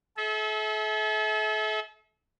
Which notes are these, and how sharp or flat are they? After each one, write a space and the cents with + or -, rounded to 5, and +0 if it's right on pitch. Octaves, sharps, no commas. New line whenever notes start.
A4 -40 E5 -30